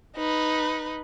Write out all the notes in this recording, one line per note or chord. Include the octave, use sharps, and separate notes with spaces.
D#4 B4